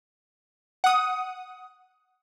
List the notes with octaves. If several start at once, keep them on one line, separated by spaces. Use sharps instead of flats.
F#5 D#6